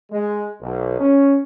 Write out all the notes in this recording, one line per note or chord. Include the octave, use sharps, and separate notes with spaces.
G#3
B1
C#4